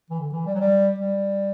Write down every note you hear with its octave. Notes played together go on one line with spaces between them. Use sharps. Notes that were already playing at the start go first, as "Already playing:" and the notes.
E3
D3
E3
G3
F#3
G3
G3